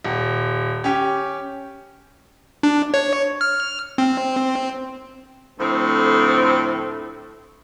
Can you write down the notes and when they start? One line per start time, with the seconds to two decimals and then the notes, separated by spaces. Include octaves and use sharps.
0.04 D#1
0.84 C#4 G4
2.63 D4
2.94 C#5
3.41 F6
3.98 C4
5.59 D2 A2 F3 C4 A4